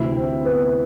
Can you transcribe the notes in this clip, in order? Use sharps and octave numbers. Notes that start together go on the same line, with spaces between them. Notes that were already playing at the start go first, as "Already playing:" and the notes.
Already playing: D2 C3 E3 E4
C4
B3